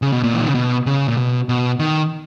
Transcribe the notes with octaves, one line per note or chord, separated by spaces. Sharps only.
C#3
B2
A#2
E3
D#3
C#3
B2
C#3
A#2
B2
B2
D#3